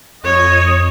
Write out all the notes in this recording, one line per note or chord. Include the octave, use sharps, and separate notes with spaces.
F2 C#5 D#5